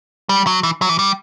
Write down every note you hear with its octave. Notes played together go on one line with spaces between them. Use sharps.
G3
F#3
E3
F#3
E3
G3